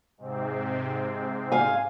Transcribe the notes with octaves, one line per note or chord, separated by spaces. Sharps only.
G#2 C3 C4
F5 G#5